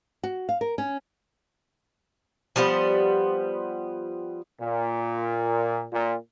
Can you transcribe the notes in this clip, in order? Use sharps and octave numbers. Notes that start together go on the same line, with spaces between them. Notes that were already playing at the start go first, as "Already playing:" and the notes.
F#4
F5
A#4
C#4
F3 G3 B3 C5
A#2
A#2